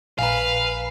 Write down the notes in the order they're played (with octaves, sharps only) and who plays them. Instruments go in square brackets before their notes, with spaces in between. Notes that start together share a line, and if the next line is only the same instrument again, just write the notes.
[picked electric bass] A#1 [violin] B4 [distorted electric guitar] F5 [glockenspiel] G#5 A#5